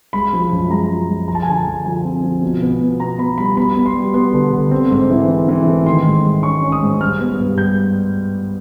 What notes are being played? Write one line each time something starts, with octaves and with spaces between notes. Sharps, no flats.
G#3 B5
F3
F#2
G#3 A#5
F3
G#3
F3 A#5
A5
G#5
D3 A5
F3
F3 G#5
C4
F3
B2
B3
B2
B3 A#5
B3 B5
G3 B5
B3 B5
B3
C6
G3
B3 C6
D3
D3
C4
G#2
E3
C4
E3
A3
D#3 C6
G#2
G#3
C#4 C#6
C#4
D#6
G#2
G3 F6
B3
G2
G3 G6